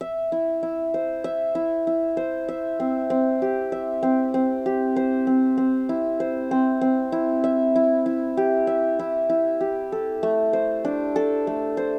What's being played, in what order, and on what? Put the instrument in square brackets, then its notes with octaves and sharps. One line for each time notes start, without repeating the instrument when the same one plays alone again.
[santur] E5
E4
E4
C5
E5
E4
E4
C5
E5
C4
C4
G4
E5
C4
C4
G4
C5
C4
C4
E4
C5
C4
C4
E4
E5
E4
E4
G4
E5
E4
E4
G4
A4
A3
C5
D4
A4
A3
C5